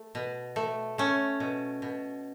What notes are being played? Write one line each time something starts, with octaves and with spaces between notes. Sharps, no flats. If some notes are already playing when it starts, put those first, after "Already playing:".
Already playing: A3
B2
A3
A3 C#4
B2
B2